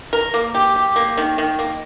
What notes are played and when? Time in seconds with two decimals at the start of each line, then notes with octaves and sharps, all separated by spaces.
0.13 A#4
0.34 A#3
0.55 G4
0.76 G4
0.96 A#3
1.17 D#3
1.38 D#3
1.59 A#3